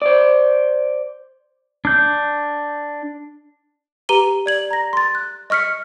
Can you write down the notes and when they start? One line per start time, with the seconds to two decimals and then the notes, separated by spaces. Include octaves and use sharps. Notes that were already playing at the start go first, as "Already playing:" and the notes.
0.02 C5 D5
1.85 D4 G6
4.09 G4 B4 A#5 D#7 G7
4.46 D5 G#6 F#7
4.71 A#5 A#6
4.93 C6 A6
5.15 F#6
5.50 D#5 C#6 F6 B6 C#7